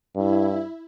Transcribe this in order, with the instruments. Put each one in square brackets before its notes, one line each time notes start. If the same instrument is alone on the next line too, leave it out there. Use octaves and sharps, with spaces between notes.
[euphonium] G2 [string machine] E4